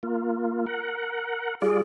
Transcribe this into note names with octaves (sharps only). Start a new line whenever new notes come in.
A#3 F4
A#4 F#5
G3 F4 G#4 D5